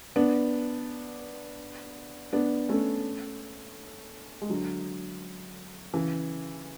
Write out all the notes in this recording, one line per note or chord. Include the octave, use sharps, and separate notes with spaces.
B3 D4
B3 D4
A3 C#4
G#3
D3 F#3
C#3 E3